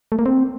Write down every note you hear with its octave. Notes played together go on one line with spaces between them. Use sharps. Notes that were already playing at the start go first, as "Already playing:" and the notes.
A3
A#3
C4